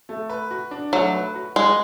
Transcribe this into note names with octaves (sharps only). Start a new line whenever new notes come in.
A3
B4
F#4
D4
F#3 A3
B4
F#4
G#3 B4